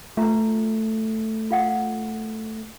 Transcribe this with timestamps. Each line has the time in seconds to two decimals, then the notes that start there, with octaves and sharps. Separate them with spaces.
0.17 A3 F4 A#5
1.51 F4 F5 F#5